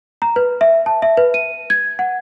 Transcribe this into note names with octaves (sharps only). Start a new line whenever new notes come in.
A#5
B4
E5
A5
E5
B4
D#7
G#6
F#5